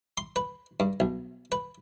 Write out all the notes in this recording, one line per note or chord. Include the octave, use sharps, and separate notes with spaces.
C6
B4
G2
B1
B4